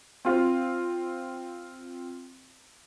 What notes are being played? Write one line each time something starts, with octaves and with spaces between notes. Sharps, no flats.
C4 F4